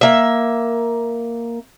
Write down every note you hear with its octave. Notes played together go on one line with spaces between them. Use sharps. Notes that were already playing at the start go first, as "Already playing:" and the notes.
A#3 E5